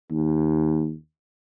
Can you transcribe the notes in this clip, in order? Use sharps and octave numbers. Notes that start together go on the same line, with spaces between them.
D#2